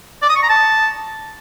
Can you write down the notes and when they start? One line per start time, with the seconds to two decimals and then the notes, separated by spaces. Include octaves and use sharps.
0.22 D5
0.29 D#6
0.36 C#6
0.42 A#5
0.49 A5